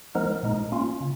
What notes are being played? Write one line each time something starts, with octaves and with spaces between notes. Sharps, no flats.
F3 G#3 B3 D#4 A#4
A#2 G#3 D#4
A#3 C#4 F4
C#3